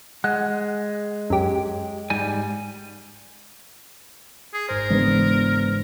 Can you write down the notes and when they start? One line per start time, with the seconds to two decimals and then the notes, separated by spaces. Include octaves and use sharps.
0.24 G#3 F#5
1.30 F#2 G4
2.10 G#2 G3 G#5
4.54 G#4
4.69 G1 G#2 A#4 C5
4.90 C#3 E3 G#3 B3 D4